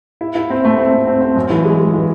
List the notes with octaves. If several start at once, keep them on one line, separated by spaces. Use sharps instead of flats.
E4
E4
C4
A3
C4
A3
C4
C4
F#2
E3
G#3
G#3
E3